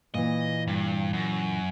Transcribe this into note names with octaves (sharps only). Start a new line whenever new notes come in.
A#2 E3 D#5
G2
F#2